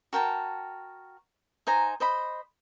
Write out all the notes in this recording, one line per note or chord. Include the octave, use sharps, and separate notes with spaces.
F#4 A#4 G5 A5
D#4 C5 G#5 A#5
C5 D#5 B5